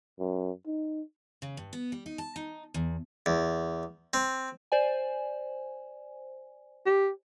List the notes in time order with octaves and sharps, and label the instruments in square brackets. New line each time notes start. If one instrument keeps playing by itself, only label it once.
[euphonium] F#2
D#4
[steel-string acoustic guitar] C#3
G2
B3
G3
D#4
A5
D#4
E2
[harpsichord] E2
C4
[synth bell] C5 D5 G#5
[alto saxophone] G4